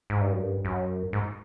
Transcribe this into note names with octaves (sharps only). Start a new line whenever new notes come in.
G#2
G2
F#2
G2
F#2
G#2